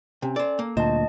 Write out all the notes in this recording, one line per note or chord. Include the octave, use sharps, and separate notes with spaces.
C3 C#4
A4 C5 D5
A#3
D2 A#2 C5 D#5 A5